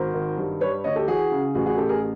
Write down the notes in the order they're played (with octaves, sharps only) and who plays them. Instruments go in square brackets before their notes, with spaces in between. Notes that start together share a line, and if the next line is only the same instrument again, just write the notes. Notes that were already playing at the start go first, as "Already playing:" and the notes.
Already playing: [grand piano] G#1 A#4 C5
D#3
G2
G3 B4 C#5
D2 C#5 D#5
G4 A4
E3 F#4 G#4
C#3
A1 F#4 G#4
F#4 G#4
A1 G4 A4
G#4 A#4